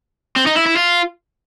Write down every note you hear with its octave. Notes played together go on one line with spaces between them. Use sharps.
C4
D#4
E4
E4
F4